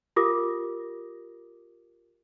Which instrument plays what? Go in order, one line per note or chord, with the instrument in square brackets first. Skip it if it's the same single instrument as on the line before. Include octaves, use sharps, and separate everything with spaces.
[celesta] F4 G4 A#4 D6 D#6 A#6